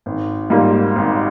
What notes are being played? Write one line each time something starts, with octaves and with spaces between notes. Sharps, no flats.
G#1
G#2 G3 A#3 F4
G#1